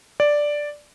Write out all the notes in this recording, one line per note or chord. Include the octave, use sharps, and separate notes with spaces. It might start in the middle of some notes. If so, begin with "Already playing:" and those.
D5